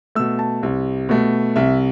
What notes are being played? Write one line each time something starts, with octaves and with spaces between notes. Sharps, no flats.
B2 A3 E6
A5
C2
B2 A3
C2 E5